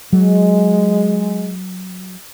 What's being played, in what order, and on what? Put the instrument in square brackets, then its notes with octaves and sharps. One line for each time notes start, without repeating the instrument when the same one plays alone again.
[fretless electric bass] F#3 [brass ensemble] G#3